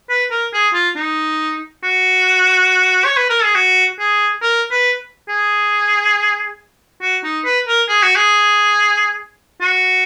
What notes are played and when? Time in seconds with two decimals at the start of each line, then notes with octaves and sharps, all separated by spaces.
0.09 B4
0.31 A#4
0.54 G#4
0.74 F4
0.96 D#4
1.83 F#4
3.05 C#5
3.17 B4
3.30 A#4
3.43 G#4
3.55 F#4
3.99 G#4
4.42 A#4
4.71 B4
5.29 G#4
7.02 F#4
7.24 D#4
7.45 B4
7.67 A#4
7.88 G#4
8.03 F#4
8.16 G#4
9.61 F#4